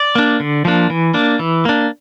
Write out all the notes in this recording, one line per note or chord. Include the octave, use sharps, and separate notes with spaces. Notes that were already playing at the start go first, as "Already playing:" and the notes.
Already playing: D5
A#3 D4
D3
F3 A#3 D4
E3
A#3 D4
E3
A#3 D4